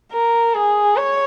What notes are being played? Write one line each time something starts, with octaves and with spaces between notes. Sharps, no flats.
A#4
G#4
C#5